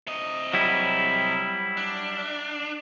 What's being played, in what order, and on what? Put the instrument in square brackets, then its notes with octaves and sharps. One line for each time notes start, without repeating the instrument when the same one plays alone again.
[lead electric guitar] C3 D#5
[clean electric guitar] F#3 G3 E4
[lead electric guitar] D4